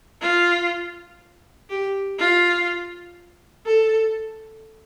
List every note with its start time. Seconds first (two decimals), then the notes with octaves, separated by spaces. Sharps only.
0.21 F4
1.70 G4
2.19 F4
3.66 A4